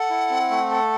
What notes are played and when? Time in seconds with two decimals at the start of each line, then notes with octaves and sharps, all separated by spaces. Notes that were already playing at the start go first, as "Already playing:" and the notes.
Already playing: A4 F#5
0.10 E4
0.30 C4
0.51 A3
0.71 A4